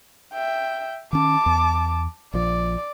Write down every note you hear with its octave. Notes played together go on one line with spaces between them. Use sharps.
E5 G5
D#3 C#4 A5 D6
E2
A#1 F3 D5